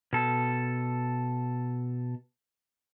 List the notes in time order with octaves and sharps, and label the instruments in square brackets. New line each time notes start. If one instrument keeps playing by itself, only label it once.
[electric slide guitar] B2 A4